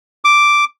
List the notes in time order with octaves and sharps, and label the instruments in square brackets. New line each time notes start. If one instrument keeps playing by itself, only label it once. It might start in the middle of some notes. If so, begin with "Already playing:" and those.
[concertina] D6